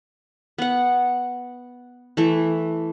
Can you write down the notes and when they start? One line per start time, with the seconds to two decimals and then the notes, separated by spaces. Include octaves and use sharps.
0.58 B3 F#5
2.17 E3 A3